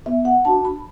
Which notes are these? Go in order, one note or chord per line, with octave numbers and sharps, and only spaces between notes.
B3 E5
F#5
D4 F#4 A5
B5